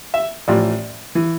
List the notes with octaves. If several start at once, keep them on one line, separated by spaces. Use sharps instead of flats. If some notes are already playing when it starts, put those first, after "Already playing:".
E5
A1 A2 F3 D5
E3